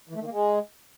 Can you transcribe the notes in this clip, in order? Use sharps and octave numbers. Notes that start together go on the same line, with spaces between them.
E3
A3
D#3
A#3
G#3